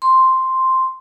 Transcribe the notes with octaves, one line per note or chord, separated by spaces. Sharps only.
C6